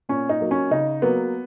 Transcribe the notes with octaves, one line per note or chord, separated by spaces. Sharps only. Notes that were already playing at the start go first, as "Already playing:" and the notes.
A#2 C#4
D#4
F#3 A#3
C#4
C#3 D#4
F#3 A#3 B3